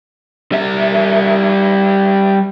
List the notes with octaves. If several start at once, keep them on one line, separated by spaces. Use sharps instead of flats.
G3 E5